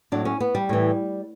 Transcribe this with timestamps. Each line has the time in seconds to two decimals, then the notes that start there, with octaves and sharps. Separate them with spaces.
0.12 A2 F#3 D4
0.25 C#4
0.40 B3
0.55 G3
0.69 A2 E3